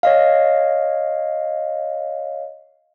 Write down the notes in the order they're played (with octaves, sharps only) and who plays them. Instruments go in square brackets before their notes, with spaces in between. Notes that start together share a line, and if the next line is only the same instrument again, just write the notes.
[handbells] C#5 D#5 F5